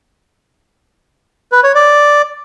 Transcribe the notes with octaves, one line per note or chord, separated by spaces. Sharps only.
B4
C#5
D5